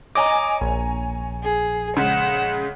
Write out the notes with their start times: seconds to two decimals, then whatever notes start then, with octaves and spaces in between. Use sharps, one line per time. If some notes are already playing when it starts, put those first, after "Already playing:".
0.15 C#5 D#5 G#5 A#5 D6
0.61 A#1
1.43 G#4
1.97 C#3 G#3 F#5 E7